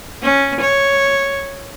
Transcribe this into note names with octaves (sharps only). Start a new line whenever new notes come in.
C#4
C#5